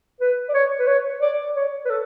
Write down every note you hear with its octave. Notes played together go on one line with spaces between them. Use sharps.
B4
D5
C#5
B4
C#5
D5
C#5
B4
A4